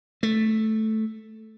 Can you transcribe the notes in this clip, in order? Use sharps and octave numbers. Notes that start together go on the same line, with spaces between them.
A3